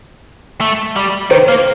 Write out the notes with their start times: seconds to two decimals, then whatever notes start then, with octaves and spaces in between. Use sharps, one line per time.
0.61 A3
0.96 G3
1.30 D#3 C5
1.48 A#3